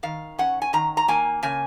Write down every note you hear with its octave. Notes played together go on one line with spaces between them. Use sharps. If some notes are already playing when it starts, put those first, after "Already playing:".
D#3 F5
C#4 F#5
G#5
D#3 A#5
A#5
A#3 G#5
C#3 G#5